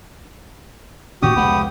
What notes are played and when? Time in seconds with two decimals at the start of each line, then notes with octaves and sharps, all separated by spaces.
1.22 A2 D#3 C#4 F#4 G4 D#6
1.36 F1 C#2 G#3 B3